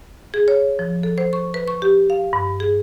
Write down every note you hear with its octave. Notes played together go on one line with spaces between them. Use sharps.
G#4
C#5
F3
A4
C5
C#6
B4
C#6
G4
F5
G2
G#4